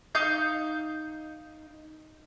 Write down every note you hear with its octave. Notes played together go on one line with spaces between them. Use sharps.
D#4 F5 G6